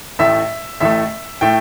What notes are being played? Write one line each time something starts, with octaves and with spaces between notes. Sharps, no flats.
A1 A2 A3 E5
A1 A2 A3 E5
A2 A3 G5